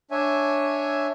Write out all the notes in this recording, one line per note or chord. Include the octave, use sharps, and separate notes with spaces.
D4 C#5 E5 G#5